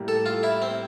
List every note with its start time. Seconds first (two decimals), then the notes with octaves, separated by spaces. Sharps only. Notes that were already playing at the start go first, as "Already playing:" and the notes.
Already playing: A2 G3 A#3
0.08 A4
0.26 F4
0.43 E4
0.62 C4